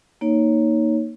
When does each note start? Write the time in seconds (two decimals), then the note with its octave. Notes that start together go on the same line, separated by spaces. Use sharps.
0.21 A#3 D#4 C#5